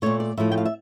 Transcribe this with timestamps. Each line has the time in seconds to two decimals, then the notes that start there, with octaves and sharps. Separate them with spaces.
0.02 A#2 A3 C#5
0.20 D5
0.37 A2 F3 A3 E5
0.52 G5
0.58 F5
0.65 E5